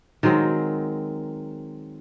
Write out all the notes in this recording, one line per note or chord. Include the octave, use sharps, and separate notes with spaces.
D#3 F#3 G#3 C4